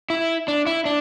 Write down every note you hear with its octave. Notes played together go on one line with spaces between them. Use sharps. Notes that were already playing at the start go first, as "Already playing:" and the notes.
E4
D4
E4
D4